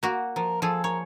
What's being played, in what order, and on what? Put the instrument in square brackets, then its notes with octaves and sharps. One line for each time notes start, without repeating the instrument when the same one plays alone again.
[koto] A#3 F#4
[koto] F3 [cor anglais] A#4
[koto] F3 G#4 [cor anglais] A4
[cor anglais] A#4 [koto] C#5